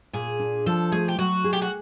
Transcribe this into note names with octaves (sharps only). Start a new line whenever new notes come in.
A#2 G#4
D4
F3 A4
A3 G#4
G4
F#3 F#4
G#4
G4
F#4